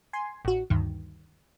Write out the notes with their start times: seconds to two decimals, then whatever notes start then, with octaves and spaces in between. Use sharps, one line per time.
0.13 G#5 C6
0.45 A1 F#4
0.70 D2 G2 D#3